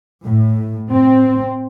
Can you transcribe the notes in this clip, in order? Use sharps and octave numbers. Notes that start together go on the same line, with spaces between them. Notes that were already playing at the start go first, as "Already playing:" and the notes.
A2
C4